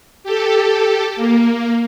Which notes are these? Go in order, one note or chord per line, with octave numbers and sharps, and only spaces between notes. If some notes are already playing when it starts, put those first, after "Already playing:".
G4 A4
A#3